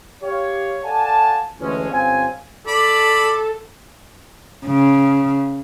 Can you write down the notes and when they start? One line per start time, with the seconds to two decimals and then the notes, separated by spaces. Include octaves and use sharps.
0.23 G4 C#5 F5
0.85 A4 D5 F5 F#5 G#5 A5
1.60 D2 E3 G#3 C#4
1.92 G1 C4 C#4 F5 G#5
2.67 A4 D5 B5
4.67 C#3